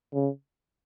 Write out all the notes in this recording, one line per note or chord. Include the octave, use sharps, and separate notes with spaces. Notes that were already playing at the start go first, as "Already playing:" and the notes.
C#3